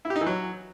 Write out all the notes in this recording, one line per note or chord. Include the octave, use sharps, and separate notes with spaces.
E4
G4
D#4
E3
F#3